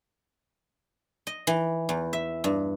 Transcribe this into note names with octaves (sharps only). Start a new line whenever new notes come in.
D#5
E3
E2
E5
G2